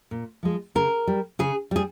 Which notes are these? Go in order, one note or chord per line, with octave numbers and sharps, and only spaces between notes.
A#2
F3 G#3
C#3 A#4
G3
C#3 G#4
G3 G#4